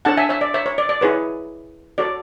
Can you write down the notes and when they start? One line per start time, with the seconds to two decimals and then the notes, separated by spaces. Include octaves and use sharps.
0.05 D4 A4 C#5 F#5 A5
0.17 E5 G#5
0.29 C#5 E5
0.41 D5
0.54 C#5 E5
0.66 C#5
0.78 D5
0.89 D5
1.01 E4 G#4 B4 C#5
1.98 F#4 A4 C#5 D5